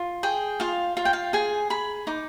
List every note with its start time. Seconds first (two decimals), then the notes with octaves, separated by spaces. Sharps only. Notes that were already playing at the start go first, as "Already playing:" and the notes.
Already playing: F4
0.23 G#4 G5
0.60 F4 F5
0.97 F4 F5
1.05 G5
1.13 F5
1.33 G#4 G#5
1.70 G#4 B5
2.07 D#4 D6